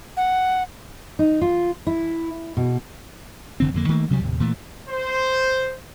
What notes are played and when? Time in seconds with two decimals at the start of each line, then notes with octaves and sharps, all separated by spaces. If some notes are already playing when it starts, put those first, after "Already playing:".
0.17 F#5
1.19 D#4
1.41 F4
1.87 E4
2.57 B2
3.60 F1 D3 C4
3.74 F2 D3 A#3
3.88 D#3 A3 A#3
4.09 D2 C3 F#3 G3
4.23 D#2 A2 C3
4.40 A#2 E3 A3
4.88 C5